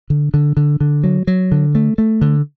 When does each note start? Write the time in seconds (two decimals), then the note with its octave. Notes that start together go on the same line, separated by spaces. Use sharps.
0.10 D3
0.34 D3
0.57 D3
0.80 D3
1.04 F#3
1.27 F#3
1.52 D3
1.75 A3
1.98 A3
2.21 D3